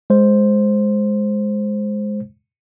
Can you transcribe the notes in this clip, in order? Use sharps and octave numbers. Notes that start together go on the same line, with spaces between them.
G#3 C5